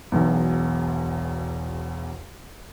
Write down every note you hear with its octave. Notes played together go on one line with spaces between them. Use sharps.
E1 B1 E2